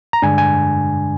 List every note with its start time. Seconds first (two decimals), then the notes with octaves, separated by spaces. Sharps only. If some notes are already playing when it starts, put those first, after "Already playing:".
0.13 A#5
0.22 G2 D3 G#3 D4 G#5
0.38 G#5